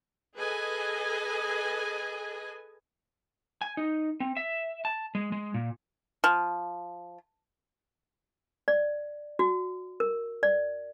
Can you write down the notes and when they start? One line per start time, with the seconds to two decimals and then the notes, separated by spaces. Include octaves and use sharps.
0.37 G#4 A4 B4 D#5 G#5
3.61 G#5
3.77 D#4
4.20 C4
4.37 E5
4.85 A5
5.15 G#3
5.32 G#3
5.54 A#2
6.24 F3
8.68 D5
9.39 F#4
10.00 A#4
10.43 D5